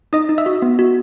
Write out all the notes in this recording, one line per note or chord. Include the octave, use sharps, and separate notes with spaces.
D#4 D#5 D#6
D#4
E5 E6
F#4
B3
F#4